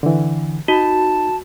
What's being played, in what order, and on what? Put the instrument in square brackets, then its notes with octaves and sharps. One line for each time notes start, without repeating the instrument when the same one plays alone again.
[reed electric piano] D3 E3
[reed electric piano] D#4 [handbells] F#4 [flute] A5